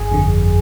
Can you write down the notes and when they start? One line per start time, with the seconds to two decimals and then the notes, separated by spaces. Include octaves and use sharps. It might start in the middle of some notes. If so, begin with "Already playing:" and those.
Already playing: G1 G#4
0.12 F2 D3